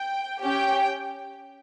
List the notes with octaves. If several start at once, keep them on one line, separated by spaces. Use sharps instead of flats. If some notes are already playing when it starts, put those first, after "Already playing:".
Already playing: G5
C#4 G4 G5